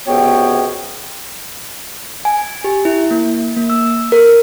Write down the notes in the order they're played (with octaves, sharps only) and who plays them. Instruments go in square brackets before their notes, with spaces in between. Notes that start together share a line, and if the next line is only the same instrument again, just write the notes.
[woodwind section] C#2 C3 B3 F#4 C#5 G5
[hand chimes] G#5
G4
E4
A#3
A#3
E6
A#4